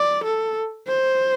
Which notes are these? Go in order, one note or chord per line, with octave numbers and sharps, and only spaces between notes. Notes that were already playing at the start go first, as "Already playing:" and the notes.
Already playing: D5
A4
C5